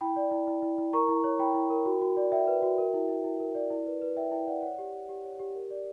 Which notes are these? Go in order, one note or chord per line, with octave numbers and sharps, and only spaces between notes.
E4 G5 B5
D5
E4
E4
E4
E4
A#4 A#5 C#6
E4
C#5
E4 G5 B5
E4
A#4
F#4
F#4
D5
D5 E5 G5
B4
F#4
A#4
E4
E4
E4
A#4
D5
E4
B4
B4
E4 E5 G5
E4 E5 G5
D5 F#5
C#5 F#5
G4
G4
G4
C#5
G4
A#4
D5